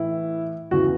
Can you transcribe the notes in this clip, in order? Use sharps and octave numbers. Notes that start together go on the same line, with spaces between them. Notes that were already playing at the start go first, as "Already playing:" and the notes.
Already playing: A2 E3 E4
E2 C#3 E3 F#4